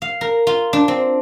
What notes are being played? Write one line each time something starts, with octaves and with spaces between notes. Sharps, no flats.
F5
A#4
F4
D4
C4